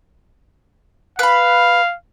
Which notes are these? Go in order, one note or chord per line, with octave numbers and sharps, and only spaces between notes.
B4 F5 B5